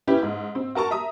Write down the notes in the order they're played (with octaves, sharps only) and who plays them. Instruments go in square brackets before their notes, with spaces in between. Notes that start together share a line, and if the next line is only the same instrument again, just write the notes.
[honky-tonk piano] C#4 E4 G4 B4
G#2
C4
F#4 A#4 A5 C#6
E5 A#5 D#6